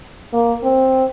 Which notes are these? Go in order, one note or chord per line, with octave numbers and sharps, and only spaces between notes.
A#3
C4